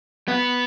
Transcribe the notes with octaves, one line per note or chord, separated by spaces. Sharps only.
B3